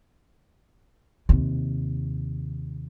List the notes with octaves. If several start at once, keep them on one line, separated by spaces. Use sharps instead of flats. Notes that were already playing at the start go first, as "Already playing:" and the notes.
D#2 C3